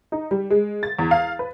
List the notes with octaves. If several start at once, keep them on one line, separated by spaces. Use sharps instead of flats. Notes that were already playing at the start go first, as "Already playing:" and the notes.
D#4
G3
G#3
A6
E2
F5
B4